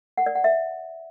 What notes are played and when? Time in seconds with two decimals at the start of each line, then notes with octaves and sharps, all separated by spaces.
0.18 F#5
0.26 D5
0.35 F#5
0.44 E5